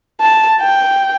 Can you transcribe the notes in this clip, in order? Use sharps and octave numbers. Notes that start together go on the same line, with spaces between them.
A5
G5